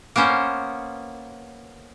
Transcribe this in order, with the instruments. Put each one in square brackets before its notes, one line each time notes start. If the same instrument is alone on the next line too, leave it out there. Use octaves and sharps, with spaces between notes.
[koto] A#3 B3 C#4 C5